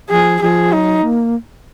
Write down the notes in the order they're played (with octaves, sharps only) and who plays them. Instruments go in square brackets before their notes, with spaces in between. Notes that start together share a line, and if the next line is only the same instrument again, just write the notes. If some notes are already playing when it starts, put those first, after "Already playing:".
[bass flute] F3 [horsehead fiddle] G#4
[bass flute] F3 [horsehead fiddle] G#4
[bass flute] F#3 [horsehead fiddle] D#4
[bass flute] A#3